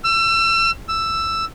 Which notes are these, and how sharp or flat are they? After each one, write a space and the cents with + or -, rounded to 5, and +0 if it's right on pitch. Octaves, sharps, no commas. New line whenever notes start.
E6 +35
E6 +5